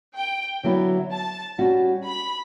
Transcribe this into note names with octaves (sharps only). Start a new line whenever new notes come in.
G5
D3 F#3 B3 E4
A5
G3 C#4 F#4
B5